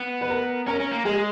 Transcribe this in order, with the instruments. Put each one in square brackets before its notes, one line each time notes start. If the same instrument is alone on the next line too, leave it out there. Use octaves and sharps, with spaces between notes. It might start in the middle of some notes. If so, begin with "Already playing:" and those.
Already playing: [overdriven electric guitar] B3
[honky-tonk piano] B4
A#4
[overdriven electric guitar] C#4 [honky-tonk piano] A#4
[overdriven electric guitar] C#4
A#3
[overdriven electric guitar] G#3 [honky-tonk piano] G#4